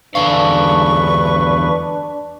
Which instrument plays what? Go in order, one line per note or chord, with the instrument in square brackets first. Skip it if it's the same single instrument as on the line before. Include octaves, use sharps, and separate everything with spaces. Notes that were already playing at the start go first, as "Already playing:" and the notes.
[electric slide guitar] E2 D3 F5 [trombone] D4 [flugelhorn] B4 [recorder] C#6